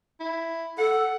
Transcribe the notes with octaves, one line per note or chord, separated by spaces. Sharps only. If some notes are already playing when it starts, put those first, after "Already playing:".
E4
A4 F#5